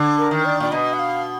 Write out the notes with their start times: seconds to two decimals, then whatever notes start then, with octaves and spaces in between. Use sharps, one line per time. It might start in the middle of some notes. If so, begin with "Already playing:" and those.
Already playing: D3
0.18 A#4
0.31 D#3
0.45 D5
0.60 A#2 D5
0.72 B2 D#5
0.93 F#5
0.99 F5